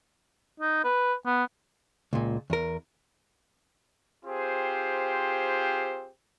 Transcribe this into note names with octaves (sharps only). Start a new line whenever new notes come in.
D#4
B4
B3
C#2 A#2
E2 A#4
C4 F4 G4 G#4 C5